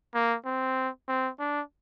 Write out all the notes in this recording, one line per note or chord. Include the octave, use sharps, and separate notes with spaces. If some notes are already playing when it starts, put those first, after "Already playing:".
A#3
C4
C4
D4